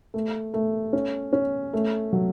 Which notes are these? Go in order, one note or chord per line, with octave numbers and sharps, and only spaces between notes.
A3
A3
C#4
C#4
A3
F#3